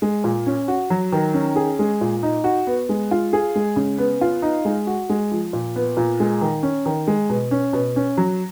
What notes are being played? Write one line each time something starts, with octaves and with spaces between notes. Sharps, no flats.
G#3
A#2
C#4
F#4
F#3
D#3
C#4
G#4
G#3
A#2
D#4
F#4
B3
G#3
F4
G#4
G#3
C#3
B3
F4
D#4
G#3
F#4
G#3
F3
A#2
B3
A#2
G#3
D#3
C#4
D#3
G#3
B2
C#4
B2
C#4
F#3